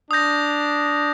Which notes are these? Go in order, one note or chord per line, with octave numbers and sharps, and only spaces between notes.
D4 D#6 G6 A#6